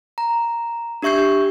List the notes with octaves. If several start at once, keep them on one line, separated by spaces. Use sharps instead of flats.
A#5
D4 G4 E5 C#6 G6 C7
G4